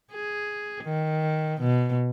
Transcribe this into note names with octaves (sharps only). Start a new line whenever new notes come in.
G#4
D#3
B2